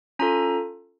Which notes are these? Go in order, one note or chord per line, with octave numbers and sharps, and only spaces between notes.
C#4 F4 A4 A#5